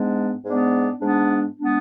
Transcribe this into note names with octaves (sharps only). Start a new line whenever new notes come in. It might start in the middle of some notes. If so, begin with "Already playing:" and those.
Already playing: G#2 G#3 B3 D4
G#2 G#3 B3 D4
G#2 G#3 B3 D4
G#3 B3 D4